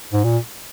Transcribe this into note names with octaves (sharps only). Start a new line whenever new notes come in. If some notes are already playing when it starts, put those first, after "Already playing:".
G#2
A#2